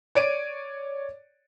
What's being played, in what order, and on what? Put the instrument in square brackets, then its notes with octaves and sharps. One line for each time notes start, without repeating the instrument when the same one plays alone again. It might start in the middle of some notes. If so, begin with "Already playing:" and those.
[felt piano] C#5 D5 D7 D#7